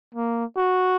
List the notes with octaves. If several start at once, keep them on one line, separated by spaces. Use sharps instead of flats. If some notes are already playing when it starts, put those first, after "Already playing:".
A#3
F#4